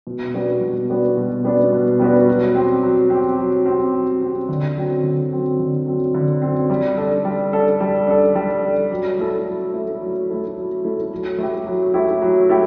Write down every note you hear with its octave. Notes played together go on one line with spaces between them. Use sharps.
B2
G3 B3 D4 F#4
B2
G3 B3 D4 F#4
B2
G3 B3 D4 F#4
B2
G3 B3 D4 F#4
F#3
C4 G4
F#3
C4 G4
F#3
C4 G4
F#3
C4 G4
D3
F#3 C4
D3
F#3 C4
D3
F#3 C4
D3
F#3 C4
G3
D4 A4
G3
D4 A4
G3
D4 A4
G3
D4 A4
F#3
A3 E4 A4
F#3
A3 E4 A4
F#3
A3 E4 A4
F#3
A3 E4 A4
F#3
A3 E4 G4
F#3
A3 E4 G4
F#3
A3 E4 G4